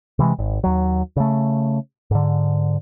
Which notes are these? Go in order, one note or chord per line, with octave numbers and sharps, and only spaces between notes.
C3 E3 F#3 G#3
G#1
D#2 F#3
C#3 A3
G#2 D3